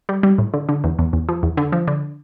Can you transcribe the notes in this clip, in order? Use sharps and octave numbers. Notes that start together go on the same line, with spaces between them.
G3
G3
A2
D3
D3
E2
E2
E2
F3
E2
D3
F3
D3